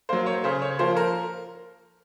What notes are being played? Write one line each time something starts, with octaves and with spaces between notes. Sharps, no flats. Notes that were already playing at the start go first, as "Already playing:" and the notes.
F#3 A#3 C5
C#5
C#3 C5
C#5
F3 A#3 C5
A#4